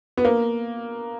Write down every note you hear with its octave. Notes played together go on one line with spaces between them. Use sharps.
B3
A#3